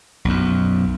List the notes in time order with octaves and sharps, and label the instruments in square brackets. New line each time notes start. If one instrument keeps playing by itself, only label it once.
[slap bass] B1 F#2